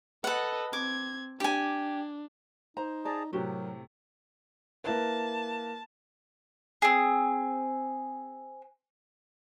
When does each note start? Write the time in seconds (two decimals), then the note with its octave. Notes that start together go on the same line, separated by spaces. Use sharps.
0.24 A4 B4 D#5 F#5
0.73 C4 D6 G#6
1.40 D4 G4 G#5
2.77 D#4 C5 A#5
3.05 G#4 D5 A5 A#5
3.33 A2 C3 F#3 F#4 G4 A#4
4.84 A#3 E4 B4 A5
6.82 C4 G#4